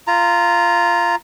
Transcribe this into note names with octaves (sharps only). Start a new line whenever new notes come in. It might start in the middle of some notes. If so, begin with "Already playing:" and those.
F4 A#5